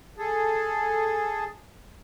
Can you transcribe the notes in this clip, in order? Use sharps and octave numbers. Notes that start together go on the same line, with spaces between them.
G#4 A4